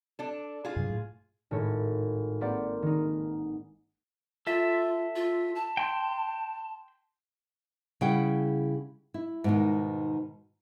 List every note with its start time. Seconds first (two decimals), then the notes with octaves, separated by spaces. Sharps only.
0.19 D4 A4
0.65 F4 G#4
0.76 G2 C3 F#3
0.90 A2
1.51 G#1 A2 C#5
2.41 A#3 C4 B4 C5 D5 F#5
2.82 D#3 D#4
4.47 F4 A4 E5
5.16 F4
5.55 A5
5.77 G5 C6
8.01 C#3 G3 E4 G#4 F#5 G5
9.14 E4
9.44 G#2 B2 D#3